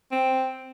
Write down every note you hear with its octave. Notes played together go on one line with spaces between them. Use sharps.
C4